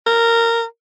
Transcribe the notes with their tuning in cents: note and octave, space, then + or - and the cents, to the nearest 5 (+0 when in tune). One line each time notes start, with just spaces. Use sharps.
A#4 -15